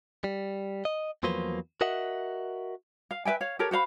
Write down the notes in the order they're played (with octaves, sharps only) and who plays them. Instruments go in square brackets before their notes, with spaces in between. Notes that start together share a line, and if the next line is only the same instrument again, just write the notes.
[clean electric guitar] G3
D#5
E2 F3 F#3 A#3 B4 C5
F#4 A#4 D#5 E5 F#5
[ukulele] F5
B4 E5 G5 G#5
C#5 F5
G4 A4 A#4 C#5
F#4 C5 F5 B5